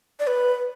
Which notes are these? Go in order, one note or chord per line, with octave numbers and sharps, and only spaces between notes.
D5
B4